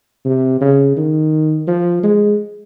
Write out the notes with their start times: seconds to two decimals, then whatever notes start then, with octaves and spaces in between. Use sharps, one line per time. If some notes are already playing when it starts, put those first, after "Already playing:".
0.25 C3
0.61 C#3
0.97 D#3
1.68 F3
2.03 G#3